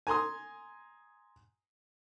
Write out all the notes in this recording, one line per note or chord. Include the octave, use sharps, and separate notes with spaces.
G#5 A#5 C6 D#6